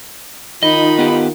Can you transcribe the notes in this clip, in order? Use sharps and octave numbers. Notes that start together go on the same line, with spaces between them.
D#3 D#4 F4 D#5 B5
B3 G4